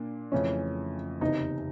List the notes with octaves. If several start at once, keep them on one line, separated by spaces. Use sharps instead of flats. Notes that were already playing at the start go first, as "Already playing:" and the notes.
Already playing: A#2 A#3 D4
F2 C#3 E3 A3 C#4
F#1 E2 C3 D#4